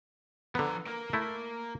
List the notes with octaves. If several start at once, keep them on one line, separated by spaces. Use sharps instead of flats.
D3 F3 B3 A#5
A#3 A#4
A3 E4